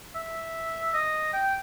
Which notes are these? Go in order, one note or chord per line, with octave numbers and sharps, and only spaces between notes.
E5
D#5
G5